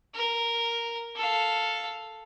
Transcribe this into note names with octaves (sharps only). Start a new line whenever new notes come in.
A#4
A4 F5